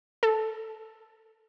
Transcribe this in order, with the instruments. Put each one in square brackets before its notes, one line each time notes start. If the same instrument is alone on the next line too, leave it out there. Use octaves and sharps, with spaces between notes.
[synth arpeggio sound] A4